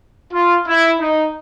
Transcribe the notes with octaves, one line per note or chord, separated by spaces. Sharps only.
F4
E4
D#4